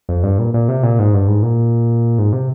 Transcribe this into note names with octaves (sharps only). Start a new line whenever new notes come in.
F2
G2
A#2
A#2
C3
A#2
G#2
G2
G#2
A#2
G#2
C3